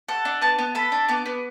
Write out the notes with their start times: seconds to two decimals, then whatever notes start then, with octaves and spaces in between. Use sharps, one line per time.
0.08 A4 F#5
0.25 D4
0.42 B3 A5
0.59 B3
0.75 A4 B5
0.92 D4
1.08 B3 D6
1.26 B3